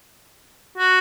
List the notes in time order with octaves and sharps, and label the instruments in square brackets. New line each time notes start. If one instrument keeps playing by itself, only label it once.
[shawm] F#4